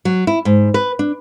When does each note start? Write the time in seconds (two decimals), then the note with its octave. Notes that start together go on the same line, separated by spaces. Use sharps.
0.05 F#3
0.27 E4
0.45 G#2
0.74 B4
0.99 D4